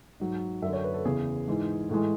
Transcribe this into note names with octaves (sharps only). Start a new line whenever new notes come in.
G#2 F#3
F#2 D3 F#3 E5
C#5
B4
A4
E2 C#3 E3 G#4
G#2 E3 G#3
A2 E3 G#3